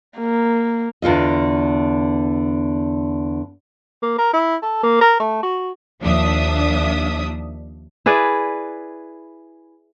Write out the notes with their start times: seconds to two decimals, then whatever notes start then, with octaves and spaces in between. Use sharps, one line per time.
0.18 A#3
1.02 E2 D3 F4 D#5
4.03 A#3
4.19 A#4
4.34 E4
4.63 A4
4.83 A#3
5.01 A#4
5.20 A3
5.43 F#4
6.02 D#2 F3 D4 E5 D#6
8.06 E4 G#4 B4 D5